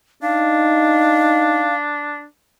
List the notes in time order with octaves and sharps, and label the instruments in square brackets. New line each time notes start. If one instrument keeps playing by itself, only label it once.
[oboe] D4 [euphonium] D#4 [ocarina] F5